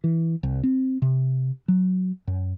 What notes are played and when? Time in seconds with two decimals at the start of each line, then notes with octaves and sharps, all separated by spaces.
0.04 E3
0.43 C2
0.63 C4
1.02 C3
1.68 F#3
2.27 F#2